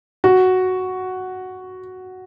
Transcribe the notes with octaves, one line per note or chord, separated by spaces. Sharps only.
F#4